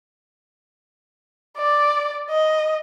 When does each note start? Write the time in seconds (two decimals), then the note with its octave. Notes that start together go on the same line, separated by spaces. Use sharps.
1.57 D5
2.30 D#5